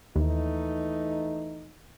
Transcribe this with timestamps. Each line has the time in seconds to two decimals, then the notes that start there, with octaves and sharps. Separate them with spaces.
0.16 D#2 E3 A3 D#4